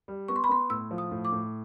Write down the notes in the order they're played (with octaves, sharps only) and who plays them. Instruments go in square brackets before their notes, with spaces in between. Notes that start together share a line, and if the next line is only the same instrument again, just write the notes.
[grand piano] G3
[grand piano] B3 [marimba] C#6
[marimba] C6
B5
[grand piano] B3 [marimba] C6
[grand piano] A2 [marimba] E6
[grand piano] F3
[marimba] D#6
[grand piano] A2
[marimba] D6
[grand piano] A2